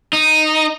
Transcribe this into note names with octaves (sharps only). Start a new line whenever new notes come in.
D#4